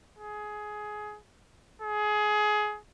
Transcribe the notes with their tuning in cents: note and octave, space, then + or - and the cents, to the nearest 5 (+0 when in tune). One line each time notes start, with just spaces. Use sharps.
G#4 +20
G#4 +20